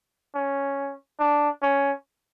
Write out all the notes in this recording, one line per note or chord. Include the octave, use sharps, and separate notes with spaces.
C#4
D4
C#4